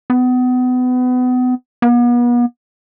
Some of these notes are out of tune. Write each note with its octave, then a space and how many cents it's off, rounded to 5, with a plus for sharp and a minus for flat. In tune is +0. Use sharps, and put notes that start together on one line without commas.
B3 +30
B3 -40